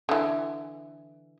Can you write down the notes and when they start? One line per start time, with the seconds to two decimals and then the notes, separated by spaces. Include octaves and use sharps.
0.09 D3 E3